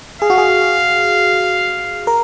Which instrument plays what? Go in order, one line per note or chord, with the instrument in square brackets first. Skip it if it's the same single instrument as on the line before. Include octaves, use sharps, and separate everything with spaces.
[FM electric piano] G#4 [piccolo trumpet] F5
[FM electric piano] F#4
G#4
A#4